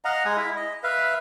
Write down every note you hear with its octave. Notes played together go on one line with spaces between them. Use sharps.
D#5 F5 F#5 A#5
G#3 G#5 D#6
E4 E5
D#5
B4 E5 F5